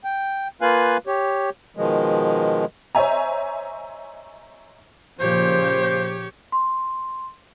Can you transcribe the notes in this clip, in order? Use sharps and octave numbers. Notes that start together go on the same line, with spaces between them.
G5
A#3 F4 B4 F5 G#5 F#6
G4 C#5
B2 D#3 F3 G#3
C5 C#5 D#5 E5 G#5 A#5
A#2 C#3 F3 G4 C5 C#5
C6